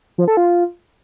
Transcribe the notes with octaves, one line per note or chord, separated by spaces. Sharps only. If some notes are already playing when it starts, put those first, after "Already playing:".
F3
A4
F4